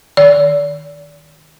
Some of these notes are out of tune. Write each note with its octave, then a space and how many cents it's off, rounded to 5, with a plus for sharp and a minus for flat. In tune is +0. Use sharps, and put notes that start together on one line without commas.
D#3 +0 D5 -30